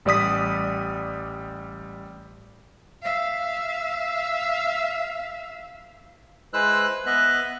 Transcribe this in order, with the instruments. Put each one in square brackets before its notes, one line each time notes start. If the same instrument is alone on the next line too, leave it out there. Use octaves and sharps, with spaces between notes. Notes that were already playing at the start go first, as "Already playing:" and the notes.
[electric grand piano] A1 G3 D5 D#6 B6
[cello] E5 F5
[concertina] G#3 E4 B4 C5 E6 F#6
B3 B4 D#5 E5 F#6